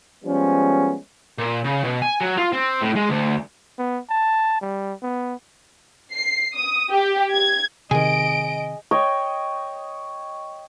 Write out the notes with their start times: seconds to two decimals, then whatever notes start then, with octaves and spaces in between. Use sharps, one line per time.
0.24 F3 G3 G#3 B3 C#4
1.38 A#2
1.65 C#3
1.85 B2
2.02 G#5
2.21 F#3
2.37 F4
2.52 C4
2.82 A2
2.96 G#3
3.09 D2
3.79 B3
4.10 A5
4.62 G3
5.03 B3
6.13 C7
6.55 D#6
6.92 G4
7.33 G#6
7.91 C3 D#3 G#4 D#5 D7
8.91 C#5 D#5 G5